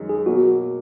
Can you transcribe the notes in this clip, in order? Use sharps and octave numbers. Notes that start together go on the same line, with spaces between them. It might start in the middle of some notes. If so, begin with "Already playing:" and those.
Already playing: F#2 D#3 G#3
G#4
B2 F#3 A#3 F#4